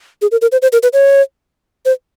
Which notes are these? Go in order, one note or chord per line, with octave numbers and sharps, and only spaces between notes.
G#4
A#4
A#4
C5
C5
A#4
B4
C#5
C5